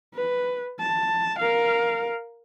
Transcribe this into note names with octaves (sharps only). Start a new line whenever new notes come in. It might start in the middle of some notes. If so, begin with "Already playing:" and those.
B4
A5
A#4 F5